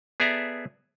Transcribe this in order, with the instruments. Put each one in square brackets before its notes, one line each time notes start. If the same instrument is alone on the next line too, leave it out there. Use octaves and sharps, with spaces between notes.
[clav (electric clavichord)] B3 G#4 A4 D5 E5 A#5